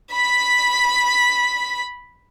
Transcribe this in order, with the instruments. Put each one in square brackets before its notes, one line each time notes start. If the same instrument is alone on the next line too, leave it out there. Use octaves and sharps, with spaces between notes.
[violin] B5 B6